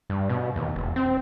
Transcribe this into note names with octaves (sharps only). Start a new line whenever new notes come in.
G2
B2
D#2
E1
C4